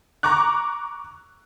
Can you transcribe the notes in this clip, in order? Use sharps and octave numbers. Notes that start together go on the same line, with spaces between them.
A#5 C#6 D6 F#6